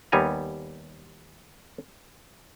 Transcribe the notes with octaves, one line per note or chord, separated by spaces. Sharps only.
D#2 G3 B3 G#5 A#5